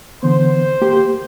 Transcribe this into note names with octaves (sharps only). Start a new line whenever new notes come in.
D3 E3 B3 C5
A#3 G4